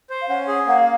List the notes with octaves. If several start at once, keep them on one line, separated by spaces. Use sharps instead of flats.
C5
F5
C#4 F#5
G#4
A#3 F#5
F5